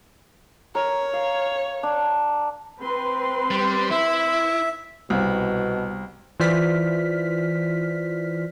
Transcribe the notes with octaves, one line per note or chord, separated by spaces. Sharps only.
A#4 C#5
F5
D4
C4 B4 C6
G3
E4 E5
C2 B2
E3 F4 C5 D5 F6 B6